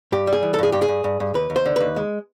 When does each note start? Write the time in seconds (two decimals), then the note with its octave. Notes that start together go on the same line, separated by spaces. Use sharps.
0.12 G2 G4
0.27 G3
0.33 G#4
0.43 E3
0.54 A4
0.59 G2 G#4
0.72 G2 G4
0.82 G#4
0.88 G2
1.04 G2
1.20 G2
1.34 D#2 B4
1.50 D#2
1.56 C5
1.66 D3
1.76 D#2 B4
1.96 G#3